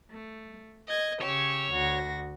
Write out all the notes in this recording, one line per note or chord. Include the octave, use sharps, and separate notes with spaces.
A3
D#5 G#6
C#3 G4 C#5 E6
D2 F#4 A#6